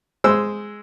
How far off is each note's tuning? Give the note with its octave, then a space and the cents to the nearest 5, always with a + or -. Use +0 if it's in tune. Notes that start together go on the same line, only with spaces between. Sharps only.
G#3 +0 C5 +0 E6 +0